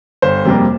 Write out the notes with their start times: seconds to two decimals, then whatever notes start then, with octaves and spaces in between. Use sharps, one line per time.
0.22 G1 C5
0.45 F2 C3 G3 A#3